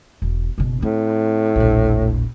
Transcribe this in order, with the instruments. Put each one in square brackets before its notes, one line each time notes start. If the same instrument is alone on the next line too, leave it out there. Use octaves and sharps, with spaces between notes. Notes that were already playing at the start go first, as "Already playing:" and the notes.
[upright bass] E1
F#1 B2
[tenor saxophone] A2 [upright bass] C4
[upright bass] E1 A#1